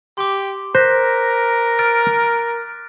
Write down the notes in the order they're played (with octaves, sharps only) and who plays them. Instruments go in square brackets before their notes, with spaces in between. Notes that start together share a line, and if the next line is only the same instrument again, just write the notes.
[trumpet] G4 [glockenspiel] C6 D6
[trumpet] A#4 [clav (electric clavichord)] C5 [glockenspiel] F#6 A#6 B6
[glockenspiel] F6 A6 D7